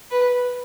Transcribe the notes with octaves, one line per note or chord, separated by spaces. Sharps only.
B4